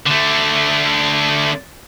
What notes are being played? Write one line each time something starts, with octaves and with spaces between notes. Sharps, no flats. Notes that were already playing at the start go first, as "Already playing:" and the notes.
D3 A3